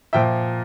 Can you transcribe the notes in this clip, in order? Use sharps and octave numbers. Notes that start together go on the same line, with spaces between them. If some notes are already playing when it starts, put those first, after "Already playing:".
A#2 F3 E5 G5